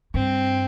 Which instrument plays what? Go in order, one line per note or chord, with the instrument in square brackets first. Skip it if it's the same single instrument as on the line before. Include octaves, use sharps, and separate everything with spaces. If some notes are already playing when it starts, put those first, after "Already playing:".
[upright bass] G2 [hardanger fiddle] C4